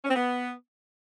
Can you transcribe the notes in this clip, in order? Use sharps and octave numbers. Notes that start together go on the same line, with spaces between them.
C#4
C4
B3